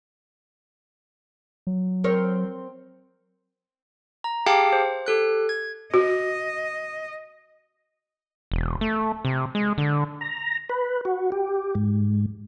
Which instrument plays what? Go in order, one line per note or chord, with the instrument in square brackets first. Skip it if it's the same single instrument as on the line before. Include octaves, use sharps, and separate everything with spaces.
[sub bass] F#3
[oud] C4 A#4 C#5
[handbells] A#5
G4 G#4 F5 G5 A5 D6
C5
G4 A4 F#6
G#6
[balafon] F#4 [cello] D#5
[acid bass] E1
A3
C3
G#3
D3
[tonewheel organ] A#5
B4
F#4
G4
G#2